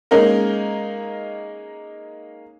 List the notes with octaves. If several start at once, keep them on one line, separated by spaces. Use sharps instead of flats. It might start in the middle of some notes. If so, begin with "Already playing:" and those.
G#3 A#3 C#4 D#4 A#4